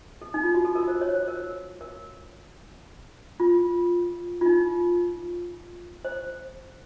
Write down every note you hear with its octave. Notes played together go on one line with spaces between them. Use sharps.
A4
D#4
F4
F#4
A4
A#4
C5
C#5
C5
A#4
A#4
F4
F4
D#4
C5